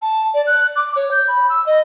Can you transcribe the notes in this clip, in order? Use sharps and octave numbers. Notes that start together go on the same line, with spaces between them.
A5
D5
F#6
D6
C#5
G6
B5
E6
D#5